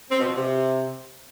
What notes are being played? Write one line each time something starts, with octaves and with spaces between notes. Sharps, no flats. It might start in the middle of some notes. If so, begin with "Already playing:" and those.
C4
B2
F3
C3